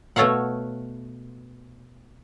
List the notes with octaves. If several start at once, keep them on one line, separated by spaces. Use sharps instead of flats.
B2 A3 A4 C#5 F5 F#5